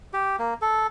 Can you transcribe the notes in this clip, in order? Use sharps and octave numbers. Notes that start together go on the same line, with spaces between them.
G4
A#3
A4